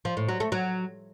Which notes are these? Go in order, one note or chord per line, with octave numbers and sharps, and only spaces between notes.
F3
A2
F#3
A3
F#3